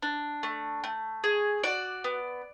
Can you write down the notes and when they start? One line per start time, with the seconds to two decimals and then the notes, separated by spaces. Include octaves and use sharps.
0.03 D4
0.43 A3
0.84 A3
1.24 G#4
1.64 F#4 D5
2.04 B3